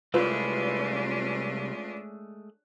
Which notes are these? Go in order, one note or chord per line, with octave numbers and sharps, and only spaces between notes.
C2 G#3 A3 C#4 D4 F4 B4